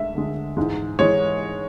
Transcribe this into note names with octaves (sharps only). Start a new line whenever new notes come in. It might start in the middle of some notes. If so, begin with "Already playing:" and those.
Already playing: D2 D3 G#3 E5
D2 D3 G#3
G#2 E3 G#3
E3 G#3 C#5